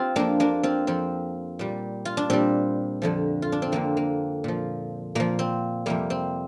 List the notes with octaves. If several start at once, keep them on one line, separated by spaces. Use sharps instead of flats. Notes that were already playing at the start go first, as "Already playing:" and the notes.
Already playing: C4 F4 G4
F2 F3 A#3 D4
A#3 D4
C4 F4
F2 F3 C4
A#2 G3
F4
D4
A#2 G3 C4
F2 D3 F3
F4
D4
C4
F2 D3 F3 A#3
A#3
A#2 F3
A#2 F3 A#3
C4
F2 C3 G3 A#3
C4